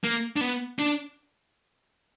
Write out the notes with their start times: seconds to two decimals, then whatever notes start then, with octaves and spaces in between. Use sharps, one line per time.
0.04 A#3
0.36 D4
0.41 B3
0.79 D4